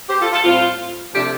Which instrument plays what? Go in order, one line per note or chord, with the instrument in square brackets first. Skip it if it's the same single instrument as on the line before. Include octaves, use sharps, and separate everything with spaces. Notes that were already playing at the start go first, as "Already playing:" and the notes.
[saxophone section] G4 C5
F4 A4
F4 A4
A2 G3 C4 F4
C3 F3 A3 D4 G4